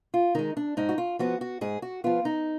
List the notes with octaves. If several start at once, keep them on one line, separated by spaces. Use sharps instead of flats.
F4
D#3 G#3 D#4
D4
G#2 D#4
F#4
F4
F3 B3 F#4
F#4
G#2 G#4
F#4
F3 B3 F4
D#4